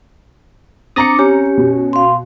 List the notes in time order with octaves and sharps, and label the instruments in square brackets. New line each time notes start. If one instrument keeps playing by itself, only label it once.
[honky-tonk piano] C4 A#5 C#7 [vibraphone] D4 D6 [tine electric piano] D#6 A6 A#6
[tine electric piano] C#4 [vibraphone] G4
[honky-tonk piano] B2
[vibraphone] F5 C6